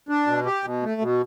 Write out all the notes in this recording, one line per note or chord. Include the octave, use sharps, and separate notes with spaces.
D4
B2
G4
B2
A3
B2